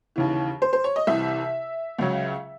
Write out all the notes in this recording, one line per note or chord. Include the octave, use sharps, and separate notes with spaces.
D#2 C#3 E3
C5
C5
C#5
D#5
C2 C3 E3 E5
C#2 C#3 F#3